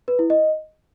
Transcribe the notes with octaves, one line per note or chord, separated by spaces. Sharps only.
B4
E4
D#5